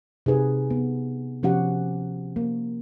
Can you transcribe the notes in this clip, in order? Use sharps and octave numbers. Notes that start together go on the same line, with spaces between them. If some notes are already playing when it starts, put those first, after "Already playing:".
C3 D#4 G#4 B4
B3
C3 F3 C#4 F#4 G4 F#5
A#3